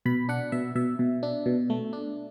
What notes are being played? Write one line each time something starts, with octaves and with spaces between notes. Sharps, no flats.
B2 B5
D4 F#5
B2 E5
B2 E5
B2
D4
B2
A3
D4